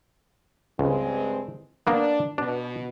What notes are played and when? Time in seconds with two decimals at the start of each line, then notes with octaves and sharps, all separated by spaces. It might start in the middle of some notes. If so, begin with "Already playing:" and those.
0.79 C#2 G2 G#3 C4
1.87 A#3 B3 D4
2.38 B2 D4